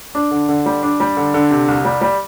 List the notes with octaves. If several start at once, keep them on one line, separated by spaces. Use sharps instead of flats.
D4
D3
D3
G3
D4
G3
D3
D3
C3
C2
G3
G3